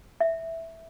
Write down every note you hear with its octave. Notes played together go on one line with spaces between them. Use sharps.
E5